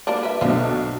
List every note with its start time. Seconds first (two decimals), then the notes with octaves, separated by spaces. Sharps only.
0.07 G3 A#3 D4
0.23 B4 E5
0.41 B1 B2 F3 A3 D4